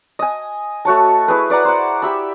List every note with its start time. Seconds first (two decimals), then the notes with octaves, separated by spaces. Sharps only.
0.19 D#5 G#5
0.85 A3 F#4 C#5 A5
1.28 E4 G#4 B4
1.50 B4 D5 F#5 A#5
1.65 C5 F#5
2.02 G4 E5 B5